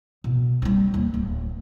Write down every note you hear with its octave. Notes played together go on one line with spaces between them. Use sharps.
B2
G3 C4
D#2
D1